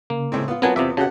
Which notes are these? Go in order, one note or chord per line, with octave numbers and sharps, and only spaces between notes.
C#3 A#3
A2 G#3 C4
B3 F4
F#3 B3 C4 F4 A#4 G#5 A5
E2 C3 B3 E5 D6
C#3 C#4 F#4 G4 A4 F#5 A5